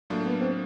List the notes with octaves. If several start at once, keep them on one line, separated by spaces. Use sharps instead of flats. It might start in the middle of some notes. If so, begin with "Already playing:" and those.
A2 F#3 A3 A#3 D4 F4
B3
C4